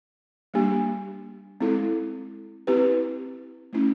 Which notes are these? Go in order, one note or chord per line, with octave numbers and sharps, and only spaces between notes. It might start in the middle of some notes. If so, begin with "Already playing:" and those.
G3 A#3 D4 G4
G#3 C4 E4 A4
C4 E4 G4 B4
A3 C#4 E4